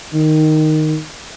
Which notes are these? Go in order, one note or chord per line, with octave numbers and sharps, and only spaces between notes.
D#3